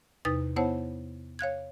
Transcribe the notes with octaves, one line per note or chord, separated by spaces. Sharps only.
E2 C3 D#4 B4 D#6 A6
B3 E4 C5 C#5 F#5 A5
C#5 F5 F#6 G#6